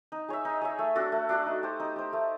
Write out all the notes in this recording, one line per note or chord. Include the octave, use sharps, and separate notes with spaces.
D#4
G#4 C#5 E5
D#4
G#4 C#5 E5
A3
D4 F#4 A4
A3
D4 F#4 A4
D#4
G4 C5
D#4
G4 C5
A3